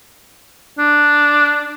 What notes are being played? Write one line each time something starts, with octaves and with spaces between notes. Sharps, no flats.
D4